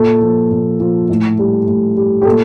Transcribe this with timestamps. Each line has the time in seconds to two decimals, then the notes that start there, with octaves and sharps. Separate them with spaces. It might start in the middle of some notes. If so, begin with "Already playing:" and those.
Already playing: A#2 A4
0.22 F3
0.51 A#2
0.80 F3
1.09 A2
1.39 G3
1.67 A2
1.96 G3
2.22 G4
2.25 A#2 A4